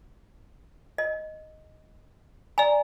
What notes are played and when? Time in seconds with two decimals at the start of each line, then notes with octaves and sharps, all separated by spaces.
0.98 D#5
2.58 D5 G#5 A#5